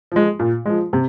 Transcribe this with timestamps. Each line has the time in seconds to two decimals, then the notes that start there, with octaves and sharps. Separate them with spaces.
0.12 F3 G#3
0.39 A#2
0.66 F3 G#3
0.93 C3